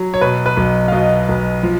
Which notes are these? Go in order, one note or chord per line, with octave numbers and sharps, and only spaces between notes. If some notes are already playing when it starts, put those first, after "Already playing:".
Already playing: F#3
C#5
B2 B4
B4
B1
F5
B2 D#5
B1
F3